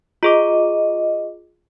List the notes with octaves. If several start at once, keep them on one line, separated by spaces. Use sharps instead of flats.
F4 G#4 D#5 D6